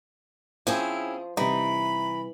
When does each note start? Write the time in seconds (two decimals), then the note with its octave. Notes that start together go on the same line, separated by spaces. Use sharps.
0.67 F3 C4 C#4 E4 G#4
1.37 C3 E3 G3 D#4 B5